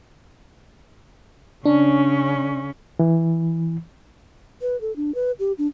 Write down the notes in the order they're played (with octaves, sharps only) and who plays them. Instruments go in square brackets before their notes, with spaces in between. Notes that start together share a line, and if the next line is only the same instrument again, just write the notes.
[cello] C#3 C#4 [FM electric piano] D4
[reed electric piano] E3
[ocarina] B4
A4
D4
B4
G4
D4